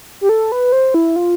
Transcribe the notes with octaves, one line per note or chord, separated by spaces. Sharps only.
G4
A4
B4
C5
E4
F4